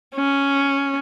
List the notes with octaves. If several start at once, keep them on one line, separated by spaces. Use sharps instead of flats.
C#4